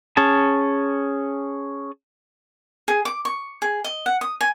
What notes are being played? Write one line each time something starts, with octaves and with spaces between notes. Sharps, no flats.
C#4 G#4 A5
G#4
D6
C#6
G#4
D#5
F#5
D#6
G#5